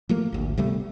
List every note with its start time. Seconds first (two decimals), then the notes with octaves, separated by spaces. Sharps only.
0.09 F3 A3 A#3
0.33 G#1 D2
0.58 C3 G3 A3 B3